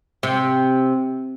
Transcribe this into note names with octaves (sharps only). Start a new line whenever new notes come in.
C3